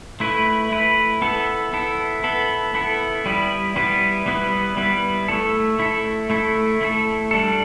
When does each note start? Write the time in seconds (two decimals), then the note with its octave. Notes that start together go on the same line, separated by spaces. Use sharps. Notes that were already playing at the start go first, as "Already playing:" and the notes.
0.20 A3 E4 B4
0.72 A3 E4 B4
1.22 B3 E4 A4
1.73 B3 E4 A4
2.24 B3 E4 A4
2.74 B3 E4 A4
3.26 G3 B3 E4 B4
3.76 G3 B3 E4 B4
4.26 G3 B3 E4 B4
4.77 G3 B3 E4 B4
5.28 A3 E4 A4
5.79 A3 E4 A4
6.30 A3 E4 A4
6.81 A3 E4 A4
7.31 G3 D4 A4